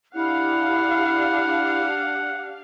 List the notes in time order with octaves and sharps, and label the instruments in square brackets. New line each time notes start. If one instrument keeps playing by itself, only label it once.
[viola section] D4 G4 F5 [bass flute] E4 [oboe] F#5